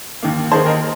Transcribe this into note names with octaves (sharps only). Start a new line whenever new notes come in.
D#2 D#3 A#3
D#2 D#3 A#3 G#4 C5
A#4 D#5